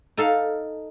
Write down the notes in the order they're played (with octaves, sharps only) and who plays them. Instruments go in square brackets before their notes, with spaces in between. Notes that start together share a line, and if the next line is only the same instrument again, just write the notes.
[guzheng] D#4 A4 F5